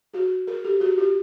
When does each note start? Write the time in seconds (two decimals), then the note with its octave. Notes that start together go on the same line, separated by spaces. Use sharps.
0.14 F#4 G#4
0.47 G#4 A#4
0.64 G4 A4
0.80 F#4 G#4
0.98 F4 G4